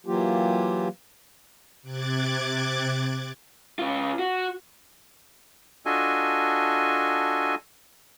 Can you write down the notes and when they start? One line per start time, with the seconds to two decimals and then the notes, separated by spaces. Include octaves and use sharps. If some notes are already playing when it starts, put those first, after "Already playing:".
0.06 E3 F#3 A#3 F4 G4
1.82 C3 D6 F#6 G#6 A6
3.79 C#3 F4
4.19 F#4
5.86 D4 F4 F#4 A4 D#5 G#5